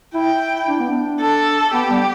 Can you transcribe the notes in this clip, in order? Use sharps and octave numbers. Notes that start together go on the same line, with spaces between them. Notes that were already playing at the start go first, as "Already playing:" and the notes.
E4 G5
D4
B3
D4
A4
B3 G4
G3